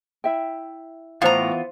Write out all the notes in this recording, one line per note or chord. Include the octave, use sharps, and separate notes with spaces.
E4 E5 G5
A2 E3 B3 F4 C5 F5 A#5